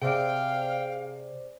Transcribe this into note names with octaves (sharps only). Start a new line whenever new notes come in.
C3 G#4 C5 D5 F5 G5